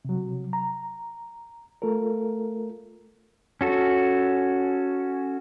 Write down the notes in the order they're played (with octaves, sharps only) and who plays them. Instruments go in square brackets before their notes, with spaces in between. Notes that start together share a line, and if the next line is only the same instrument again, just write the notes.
[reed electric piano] C3 F#3
A#5
A3 F4 A4 A#4
[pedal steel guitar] C#4 F#4 A4